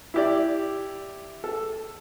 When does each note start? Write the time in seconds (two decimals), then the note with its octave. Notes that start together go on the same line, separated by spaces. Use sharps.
0.14 E4 G4 D5
1.44 A4